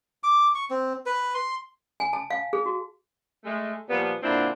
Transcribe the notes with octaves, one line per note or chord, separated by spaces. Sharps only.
D6
C#6
C4
B4
C6
G#5
A5
F5
G#4
F#4
G#3 A3
A#2 F3 G3 B3
A#2 D3 C4 D4 E4 B5